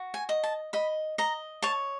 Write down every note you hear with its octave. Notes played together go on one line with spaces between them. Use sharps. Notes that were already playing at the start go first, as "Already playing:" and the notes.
Already playing: F#4
G#5
D#5
A5
D#5 B5
D#5 A#5
C#5 A5